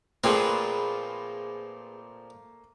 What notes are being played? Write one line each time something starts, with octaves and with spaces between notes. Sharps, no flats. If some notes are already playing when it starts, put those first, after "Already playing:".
A#2 F3 A3 A#3 C4 G#4 B4